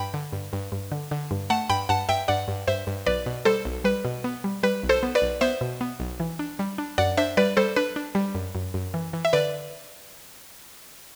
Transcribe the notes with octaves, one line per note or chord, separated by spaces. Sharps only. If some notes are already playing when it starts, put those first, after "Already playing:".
Already playing: G2 G5 B5
D3
G2
G2
G2
D3
D3
G2
A3 F#5 A5
G2 G5 B5
G2 F#5 A5
G2 E5 G5
G2 D5 F#5
G2
G2 C5 E5
G2
B1 B4 D5
B2
G3 A4 C5
B1
G3 B4
B2
B3
G3
G3 B4
B1
A4 C5
B3
B4 D5
B1
B3 C5 E5
B2
B3
B1
E3
D4
G3
D4
F#2 D5 F#5
D4 C5 E5
G3 B4 D5
G3 A4 C5
D4 B4
D4
G3
F#2
F#2
F#2
E3
E3
E5
D3 B4 D5